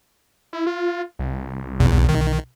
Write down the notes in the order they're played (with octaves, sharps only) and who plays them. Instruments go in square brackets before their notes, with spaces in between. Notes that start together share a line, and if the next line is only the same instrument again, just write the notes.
[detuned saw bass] E4
F4
C2
[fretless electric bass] B1 [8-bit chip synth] E2
[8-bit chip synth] D#3